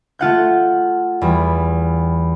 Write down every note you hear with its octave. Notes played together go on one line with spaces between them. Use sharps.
A3 F4 F#5 G6
E2 G3